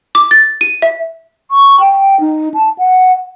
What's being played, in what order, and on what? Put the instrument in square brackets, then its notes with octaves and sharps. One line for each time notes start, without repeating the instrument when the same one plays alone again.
[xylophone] D6
A6
D#7
E5
[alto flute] C#6
G5
D#4
A5
F#5